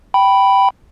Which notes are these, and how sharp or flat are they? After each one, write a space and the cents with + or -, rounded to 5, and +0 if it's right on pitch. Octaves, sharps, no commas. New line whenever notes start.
G5 -10 B5 +0